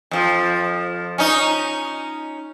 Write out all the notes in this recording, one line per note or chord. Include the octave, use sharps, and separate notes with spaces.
F2 F3
C#4 D#4